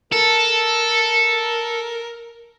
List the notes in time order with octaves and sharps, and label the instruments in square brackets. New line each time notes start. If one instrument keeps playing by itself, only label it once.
[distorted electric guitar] A4 [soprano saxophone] A#4